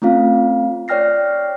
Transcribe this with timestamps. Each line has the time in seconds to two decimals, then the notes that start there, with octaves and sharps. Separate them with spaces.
0.02 A3 C4 C#4 F4 F5
0.88 C#5 D5 G5 F6 A#6 C7